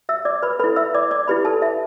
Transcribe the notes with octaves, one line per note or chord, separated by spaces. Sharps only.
E5 E6
D5 D6
B4 B5
E4 A4 B4 B5
E5 E6
D5 D6
D5 D6
E4 G4 B4 B5
A4 A5
E5